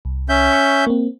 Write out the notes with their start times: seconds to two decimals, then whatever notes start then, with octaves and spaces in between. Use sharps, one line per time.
0.05 C2
0.29 C#4 E5 G6
0.53 C#6 F#6
0.87 A#3 C4